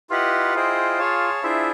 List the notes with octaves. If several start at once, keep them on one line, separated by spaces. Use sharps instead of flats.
E4 F4 G4 B4 D#5 F#5
E4 G#4 C5 D#5 G5
G#4 C#5 F5 A5
D4 E4 F4 G#4 C5 E5